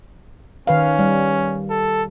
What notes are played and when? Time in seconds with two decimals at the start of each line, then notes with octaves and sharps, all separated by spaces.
0.67 D#3 C#4 B4 F5
0.99 G3
1.70 A4